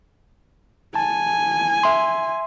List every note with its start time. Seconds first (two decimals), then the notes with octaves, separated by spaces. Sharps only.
0.95 G#5 A5
1.83 E5 C6